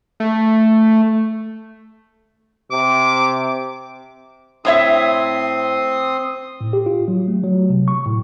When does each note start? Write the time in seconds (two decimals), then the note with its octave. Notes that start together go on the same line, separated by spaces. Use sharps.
0.20 A3
2.71 C3 D6
4.65 A2 C4 C#5 E5 C6 D#6
6.61 A2
6.73 G4
6.86 F4
7.08 F#3
7.28 A3
7.43 F#3
7.70 C3
7.88 C#6
8.05 A2